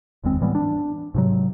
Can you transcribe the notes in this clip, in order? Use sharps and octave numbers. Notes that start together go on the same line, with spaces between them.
F1 D#2 G#3 C4
A2 E3 G3 B3
D4
G#2 C3 F#3